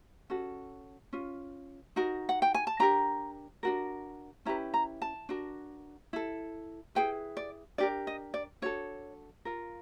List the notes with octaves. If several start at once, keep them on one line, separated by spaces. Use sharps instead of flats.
C#4 F#4 A4
C#4 F4
D#4 F#4 A#4
F#5
G5
G#5
A5
D4 G4 A#4 A#5
D4 F#4 A#4
C#4 E4 G4 B4 A#5
A#5
A5
D4 F#4 A#4
E4 A4
E4 G#4 B4 G5
D5
D4 G4 A#4 D5
D#5
D5
D4 F#4 A4 C#5
F4 A#4